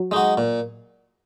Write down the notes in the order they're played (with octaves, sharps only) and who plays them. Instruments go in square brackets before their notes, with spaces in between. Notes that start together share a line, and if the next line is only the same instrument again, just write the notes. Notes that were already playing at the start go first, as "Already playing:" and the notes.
Already playing: [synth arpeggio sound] F#3
[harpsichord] G#3 D#4 F#4
A#2